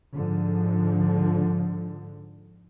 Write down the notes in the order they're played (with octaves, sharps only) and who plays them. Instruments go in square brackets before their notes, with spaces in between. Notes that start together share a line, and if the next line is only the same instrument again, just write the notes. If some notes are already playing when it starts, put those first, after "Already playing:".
[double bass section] G#2 D3 F3